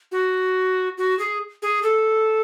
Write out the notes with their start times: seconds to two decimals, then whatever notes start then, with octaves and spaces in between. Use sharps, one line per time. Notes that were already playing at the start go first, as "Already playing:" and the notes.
0.12 F#4
0.98 F#4
1.19 G#4
1.62 G#4
1.83 A4